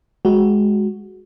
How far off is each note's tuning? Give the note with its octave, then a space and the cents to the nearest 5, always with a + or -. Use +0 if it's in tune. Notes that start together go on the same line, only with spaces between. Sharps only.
G#3 +5 F#4 +0